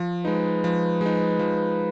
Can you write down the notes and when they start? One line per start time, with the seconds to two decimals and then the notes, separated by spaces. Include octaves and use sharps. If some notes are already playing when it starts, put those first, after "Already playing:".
Already playing: F3
0.25 G#3 D#4 B4
0.64 F3
1.01 G#3 D#4
1.39 F3